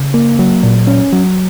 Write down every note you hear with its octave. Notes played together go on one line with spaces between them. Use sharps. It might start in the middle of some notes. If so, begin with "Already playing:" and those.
Already playing: C#3
A#3
F#3
A#2
C#4
F#3